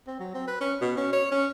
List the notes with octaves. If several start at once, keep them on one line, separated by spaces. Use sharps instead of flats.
C4
F#3
C4
B4
C#4
B2
C#4
C#5
C#4